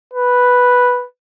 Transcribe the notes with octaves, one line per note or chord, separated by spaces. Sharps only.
B4